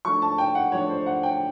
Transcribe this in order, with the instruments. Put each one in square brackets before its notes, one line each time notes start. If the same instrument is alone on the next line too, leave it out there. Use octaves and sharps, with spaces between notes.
[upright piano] F3 A3 D4 C#6
A5
G5
F#5
F3 A3 D4 C#5
C5
F#5
G5